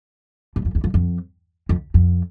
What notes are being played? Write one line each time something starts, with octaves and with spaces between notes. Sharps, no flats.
G2
F2
E2
F2
F2
F2
F2